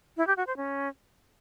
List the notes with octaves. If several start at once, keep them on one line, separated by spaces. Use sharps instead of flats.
E4
G4
F#4
C5
C#4